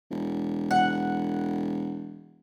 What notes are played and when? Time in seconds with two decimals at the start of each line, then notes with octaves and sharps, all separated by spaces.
0.11 E1
0.71 E1 F#5